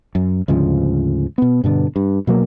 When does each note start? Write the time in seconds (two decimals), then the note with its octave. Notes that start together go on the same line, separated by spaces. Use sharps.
0.15 F#2
0.48 D2 G#2 C#3 F3
1.38 B2 B3
1.64 G2 B2 D3 B3
1.96 G2
2.27 B2 F#3 A#3